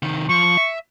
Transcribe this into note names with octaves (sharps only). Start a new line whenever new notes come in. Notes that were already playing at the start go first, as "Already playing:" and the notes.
C3 D#3
F3 C#6
E5